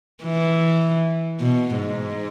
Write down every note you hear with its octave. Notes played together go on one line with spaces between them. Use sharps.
E3
B2
G#2